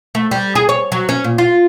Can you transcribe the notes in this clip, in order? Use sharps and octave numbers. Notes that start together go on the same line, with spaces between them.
A3
G3
G#4
C#5
F#3
C#4
A#2
F4